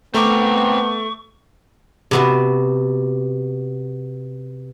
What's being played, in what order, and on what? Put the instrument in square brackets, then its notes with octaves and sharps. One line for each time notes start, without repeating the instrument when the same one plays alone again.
[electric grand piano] A3 D6 [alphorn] B3 [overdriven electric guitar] C4 A#4 [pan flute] C#6
[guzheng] C3 B3 F#4